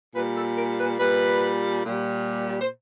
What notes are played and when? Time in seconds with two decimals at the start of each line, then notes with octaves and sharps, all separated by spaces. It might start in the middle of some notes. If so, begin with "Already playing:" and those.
0.14 A#2 G3 B4
0.35 A4
0.56 A#4
0.77 B4
0.98 A#2 G3 B4
1.84 A#2 G3
2.60 C5